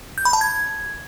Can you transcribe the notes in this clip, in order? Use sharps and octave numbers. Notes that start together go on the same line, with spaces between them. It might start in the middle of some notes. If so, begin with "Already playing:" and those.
G6
B5
A5
G#6